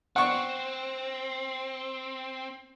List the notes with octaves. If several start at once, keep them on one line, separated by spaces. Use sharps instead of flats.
C4 F#5 C#6